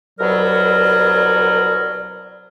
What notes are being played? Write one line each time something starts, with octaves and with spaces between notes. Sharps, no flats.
C2 B2 F#3 A#4 D5